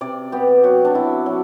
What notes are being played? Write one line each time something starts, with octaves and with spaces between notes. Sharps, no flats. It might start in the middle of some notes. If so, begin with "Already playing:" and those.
C3 D5
B3 G4
F#3 F#4
D4
C3 E4
F#3